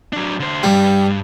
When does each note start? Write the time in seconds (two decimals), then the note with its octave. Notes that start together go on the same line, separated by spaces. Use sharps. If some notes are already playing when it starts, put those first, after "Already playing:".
0.13 F#3 D4
0.40 D3 C5
0.63 C2 G2 G3